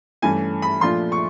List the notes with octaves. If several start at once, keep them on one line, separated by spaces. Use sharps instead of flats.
G2 E3 A3 C#4 G#5
B5
A#2 F3 A3 D4 F4 C6
C#6